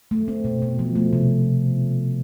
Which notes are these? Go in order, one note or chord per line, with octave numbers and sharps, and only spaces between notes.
A3
C4
B2
B2
F3
A3
C3